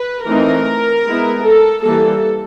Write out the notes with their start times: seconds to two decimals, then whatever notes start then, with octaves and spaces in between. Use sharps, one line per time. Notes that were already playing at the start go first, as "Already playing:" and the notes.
Already playing: B4
0.25 E3 A3 C4 D#4 A#4
1.04 G#3 B3 E4
1.43 A4
1.83 E3 G3 A#3 A4